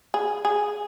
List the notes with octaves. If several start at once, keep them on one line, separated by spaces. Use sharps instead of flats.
G#4
G#4